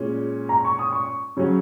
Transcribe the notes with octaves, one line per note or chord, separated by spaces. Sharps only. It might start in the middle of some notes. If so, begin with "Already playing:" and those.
Already playing: A#2 G#3 C#4
A#5
C#6
D#6
C#6
C#3 F#3 C#4